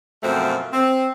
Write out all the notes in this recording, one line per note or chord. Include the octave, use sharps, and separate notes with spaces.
F#2 B2 F3 A3 C4
C4